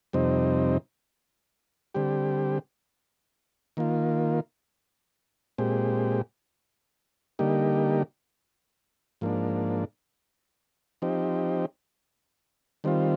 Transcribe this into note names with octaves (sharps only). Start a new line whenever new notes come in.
F2 C3 G3 C4 D#4
D3 G3 C4 G4
D#3 A#3 F4
A#2 G#3 C4 G4
D3 G3 A#3 D#4 G4
G#2 F3 A#3 D4
F3 C4 D#4 G4
D#3 G3 C4 F4